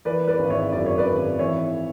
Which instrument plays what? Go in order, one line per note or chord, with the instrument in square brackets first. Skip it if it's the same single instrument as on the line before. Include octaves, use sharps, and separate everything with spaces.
[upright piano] E3 B4 D5
B4 D5
G#1
C#5 E5
F#2 D5
C#5
B4 D5
G#1
E3 C#5 E5